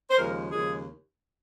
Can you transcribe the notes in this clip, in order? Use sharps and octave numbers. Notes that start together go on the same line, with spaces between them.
C5
D#2 C#3 F3 G#3 A#4
D#2 C#3 F3 G#3 G#4